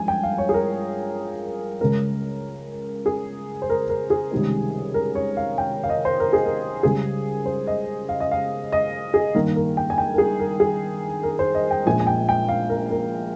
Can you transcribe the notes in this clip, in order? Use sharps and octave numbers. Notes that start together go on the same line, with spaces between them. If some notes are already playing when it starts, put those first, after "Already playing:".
Already playing: G2 F3 G#3 G#5
G5
F5
C#5
G#4
A#4
C#2 C#3 G#3 C#4 A#4
G#4
C5
A#4
A#4
G#4
C#2 C3 D#3 G3 C#4
A#4
C#5
F5
G5
F5
D#5
C5
A#4
G#4
A#4
C#2 C#3 G3 G#4
C5
D#5
F5
D#5
F5
D#5
G#4
G2 D#3 A#3 A#4
A#4
G5
G#5
G5
A#4
G#4
A#4
G#4
A#4
C5
D#5
G5
A#1 A#2 G#3 G#5
G#5
G5
G5
F5
A#4
A#4